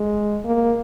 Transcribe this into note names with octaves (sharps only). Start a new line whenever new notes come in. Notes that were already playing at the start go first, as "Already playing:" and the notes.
Already playing: G#3
A#3